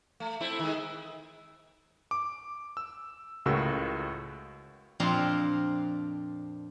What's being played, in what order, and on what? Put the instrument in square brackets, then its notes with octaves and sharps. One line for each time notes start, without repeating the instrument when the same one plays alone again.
[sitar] A3
A3 C4 E4
D#3 G#3
[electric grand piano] D6
E6
C#2 A2 C#3 F#4 A#4 E6
[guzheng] F2 A#2 C4 D4 F5 A#5